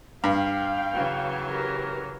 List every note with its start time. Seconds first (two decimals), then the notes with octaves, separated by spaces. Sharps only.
0.24 G2 F5 G5
0.93 C#3 E3 F#3
1.47 G4 A#4